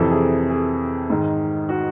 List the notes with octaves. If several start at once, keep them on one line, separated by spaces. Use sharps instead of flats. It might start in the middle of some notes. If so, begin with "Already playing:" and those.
Already playing: F2 C3 E3 A4
G#4
G#4
G#2 D#3
F#4